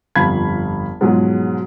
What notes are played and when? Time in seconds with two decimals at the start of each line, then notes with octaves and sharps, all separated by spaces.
0.16 G1 F2 F5 B5 G#6
1.01 G#2 B2 F3 F#3 G#3